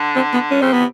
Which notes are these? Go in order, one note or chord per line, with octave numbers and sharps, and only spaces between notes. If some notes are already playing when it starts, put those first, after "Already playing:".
Already playing: D3
C4
B3
C#4
C#3 C4
C3 B3